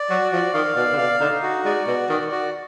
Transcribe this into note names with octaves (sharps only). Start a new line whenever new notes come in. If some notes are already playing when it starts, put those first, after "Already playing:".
Already playing: D5
F#3 F#4
F3 D5
D#3 F5
B2 D5
D3
B2 F5
D3 D#4
F#4
G#3 D5
B2 F#4
D#3 D5
F#4